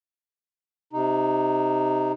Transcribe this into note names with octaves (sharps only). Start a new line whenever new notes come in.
C3 D#4